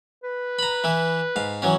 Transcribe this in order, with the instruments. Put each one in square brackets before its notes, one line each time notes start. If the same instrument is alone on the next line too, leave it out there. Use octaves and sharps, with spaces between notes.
[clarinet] B4
[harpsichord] A#5 B5
E3 E4
G#2 F5
E3 F#3 C#4